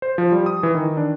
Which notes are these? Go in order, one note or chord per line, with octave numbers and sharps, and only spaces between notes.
C5
F3
G3
D#6
E3
D#3
D4